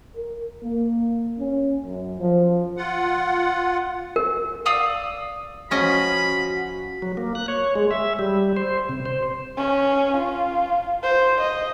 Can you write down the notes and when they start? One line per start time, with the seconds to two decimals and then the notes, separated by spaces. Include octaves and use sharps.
0.16 A#4
0.63 A#3
1.39 C#4
1.84 F#2
2.19 F3
2.77 F4 F#5
4.16 A#4
4.66 D5 F5 D#6 E6
5.71 F3 C#4 F#4 D#5 B5
7.02 F#3
7.17 A#3
7.35 F#6
7.48 C#5
7.75 G#3
7.91 E5
8.19 G3
8.56 C5
8.89 C3
9.06 C5
9.57 C#4
10.17 F4
11.03 C5
11.41 D#5